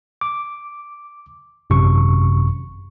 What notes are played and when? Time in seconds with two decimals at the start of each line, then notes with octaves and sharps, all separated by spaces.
0.21 D6
1.70 G#1 F#2 C3 C#6